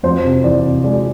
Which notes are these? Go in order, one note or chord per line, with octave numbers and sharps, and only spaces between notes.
F2 C5
C3
E3 D5
C3
G#3 D5